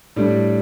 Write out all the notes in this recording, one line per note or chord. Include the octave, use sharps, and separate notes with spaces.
A2 G3 D4